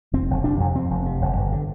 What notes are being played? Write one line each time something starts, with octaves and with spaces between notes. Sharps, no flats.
F1 C4
F1
C3 D4
F2
F2 C4
F1
C3
F1
G1
D3